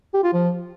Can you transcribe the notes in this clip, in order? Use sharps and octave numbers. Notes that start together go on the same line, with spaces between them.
G4
F4
F3